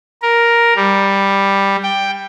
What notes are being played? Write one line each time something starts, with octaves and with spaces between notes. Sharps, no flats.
A#4
G3
G5